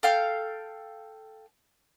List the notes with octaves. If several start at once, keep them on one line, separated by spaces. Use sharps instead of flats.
A4 F5 G5 F6